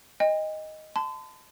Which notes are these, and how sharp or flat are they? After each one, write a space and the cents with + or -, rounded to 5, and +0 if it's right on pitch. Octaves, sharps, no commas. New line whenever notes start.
D#5 +0 G5 +45
A5 +0 C6 -40